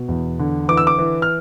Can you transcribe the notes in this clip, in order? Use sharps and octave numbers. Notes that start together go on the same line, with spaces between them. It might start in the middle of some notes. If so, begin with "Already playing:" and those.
Already playing: B2
E2
D3
E3 D6
E6
D6
E3
F6